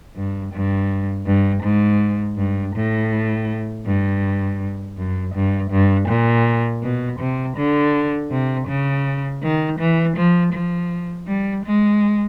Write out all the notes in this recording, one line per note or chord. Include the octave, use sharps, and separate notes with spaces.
G2
G2
G2
G#2
G2
A2
G2
F#2
G2
G2
A#2
B2
C3
D3
C3
C#3
D#3
E3
F3
F3
G3
G#3